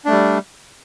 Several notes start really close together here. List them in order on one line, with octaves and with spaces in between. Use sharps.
D4 A3 G3